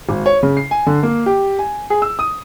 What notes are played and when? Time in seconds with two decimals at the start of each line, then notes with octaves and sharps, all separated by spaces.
0.09 G#1
0.26 C#5
0.43 C#3
0.57 C7
0.71 G#5
0.86 D3
1.03 A#3
1.26 G4
1.59 G#5
1.90 G#4
2.02 E6
2.19 D#6